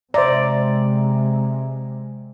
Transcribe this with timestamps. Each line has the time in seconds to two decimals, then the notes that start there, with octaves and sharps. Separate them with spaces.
0.14 C3 G#3 C5 D5 E5 A#5